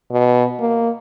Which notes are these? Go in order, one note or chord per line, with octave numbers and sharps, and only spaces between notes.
B2
A#3